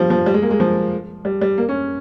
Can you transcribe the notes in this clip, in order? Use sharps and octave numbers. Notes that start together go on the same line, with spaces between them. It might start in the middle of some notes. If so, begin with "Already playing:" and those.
Already playing: F3 G3
F3
G3
G#3
A#3
G#3
F3
G3
G3
A#3
C#4